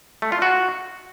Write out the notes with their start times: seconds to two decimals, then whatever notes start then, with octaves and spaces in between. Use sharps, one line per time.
0.22 A3
0.32 F4
0.42 F#4